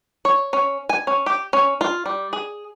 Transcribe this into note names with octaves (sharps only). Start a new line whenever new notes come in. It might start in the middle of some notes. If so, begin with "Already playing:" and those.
C#5
C#4
G#5
C#4
G4
C#4
F4
G3
G#4